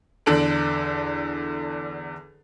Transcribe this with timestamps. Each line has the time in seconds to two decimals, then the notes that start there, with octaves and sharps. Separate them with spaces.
0.26 E2 D3 D4 A4 D7 F#7